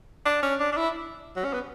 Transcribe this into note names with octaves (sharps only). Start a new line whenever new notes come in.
D4
C#4
D4
D4
E4
F#3
C#4
B3